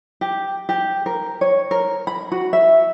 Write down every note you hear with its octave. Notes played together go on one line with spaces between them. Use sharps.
G4
G4
A#4
C#5
A#4
B5
F#4
E5